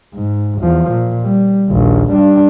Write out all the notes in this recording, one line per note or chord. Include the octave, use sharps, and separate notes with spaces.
G#2
E2 F3
A#2
G3
A#1 D#2
G3 D4